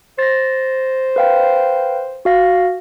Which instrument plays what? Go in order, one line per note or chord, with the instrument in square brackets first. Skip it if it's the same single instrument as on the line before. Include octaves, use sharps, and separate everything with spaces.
[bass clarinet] C5 [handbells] A6 A#6
[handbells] B4 F5 G5
F#4 F5 A#6